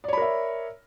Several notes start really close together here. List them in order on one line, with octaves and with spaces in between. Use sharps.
D5 C#5 B5 A#4 E5